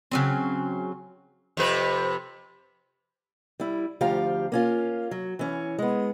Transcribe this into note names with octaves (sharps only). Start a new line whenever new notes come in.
C#3 F#3 C4
F2 C3 B4
G3 E4
D2 F3 F4 G4 F5 A#5
A#3 C#4 F4
F#3
E3 C#4
G#3 B3